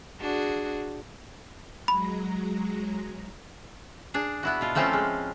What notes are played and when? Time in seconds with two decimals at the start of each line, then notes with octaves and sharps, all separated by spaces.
0.21 D4 F#4 G#4
1.88 F#3 G#3 A#5 B5
4.14 D4 G#4
4.43 B3 E4 F#4
4.61 B2 F4
4.75 F3 A3 C4 C#4 E4 F4
4.93 G#3